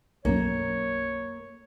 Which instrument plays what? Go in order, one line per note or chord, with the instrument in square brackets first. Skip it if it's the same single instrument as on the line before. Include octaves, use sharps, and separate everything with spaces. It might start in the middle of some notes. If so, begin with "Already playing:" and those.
[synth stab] B1 F#2 [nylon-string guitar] A#3 [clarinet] C#5